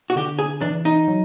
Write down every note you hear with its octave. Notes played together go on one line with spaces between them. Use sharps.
F#4
D3 G4
G#4
E3 D4
D#4
F#3